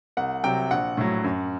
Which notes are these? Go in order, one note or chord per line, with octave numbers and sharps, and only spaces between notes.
C2 F#5
C3 F#3 G5
A#1 F#5
A2 F#3
F#2